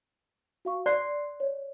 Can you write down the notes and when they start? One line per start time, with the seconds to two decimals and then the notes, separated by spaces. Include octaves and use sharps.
0.65 F#4 F5 C#6
0.86 D5 C6 F#6 C7
1.40 C#5